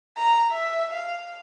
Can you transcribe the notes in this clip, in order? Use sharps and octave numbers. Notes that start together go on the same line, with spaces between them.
A#5
E5
F5